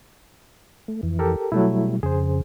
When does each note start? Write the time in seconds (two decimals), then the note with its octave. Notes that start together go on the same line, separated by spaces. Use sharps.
0.88 A3
1.03 F2 E3
1.19 G4 A4 A#4
1.52 B2 F#3 G3 A3 E4
2.03 F2 C#3 G#4 C5